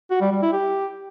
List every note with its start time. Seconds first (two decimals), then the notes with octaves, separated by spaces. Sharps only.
0.10 F#4
0.21 G3
0.31 G3
0.42 E4
0.53 G4